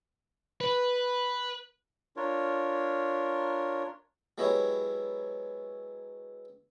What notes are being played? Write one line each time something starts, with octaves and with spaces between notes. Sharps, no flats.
B4
D4 F4 A#4 C#5
F#3 G#3 B3 E4 G4 C#5